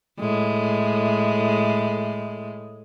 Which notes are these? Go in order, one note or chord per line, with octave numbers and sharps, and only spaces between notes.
A2 G#3